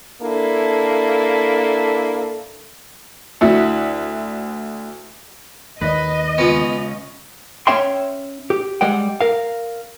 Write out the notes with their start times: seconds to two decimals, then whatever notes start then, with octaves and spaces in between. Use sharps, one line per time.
0.21 A#3 D4 E4 A4
3.41 D2 E4 F#4 E5 F#5
5.82 D#2 B4 D#5
6.38 C#2 B3 C#4 F4
7.67 C#4 C#5 E5 G5 C6
8.50 G4
8.81 G3 G#3 D5 F#5 G5
9.21 A#4 F5